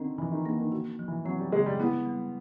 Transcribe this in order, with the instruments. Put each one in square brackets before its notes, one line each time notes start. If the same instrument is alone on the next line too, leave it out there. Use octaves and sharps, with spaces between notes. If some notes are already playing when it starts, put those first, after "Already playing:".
Already playing: [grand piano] D3 D#3 [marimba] C4
[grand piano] E3 [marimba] F3
[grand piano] D#3
[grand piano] D3 [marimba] A#3
[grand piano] D#3
[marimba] F#4
F3
[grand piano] E3
[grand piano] F#3 [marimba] C4
[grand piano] G3
[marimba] C#3 [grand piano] G#3
[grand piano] G3
[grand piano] B3 [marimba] E4
[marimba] G3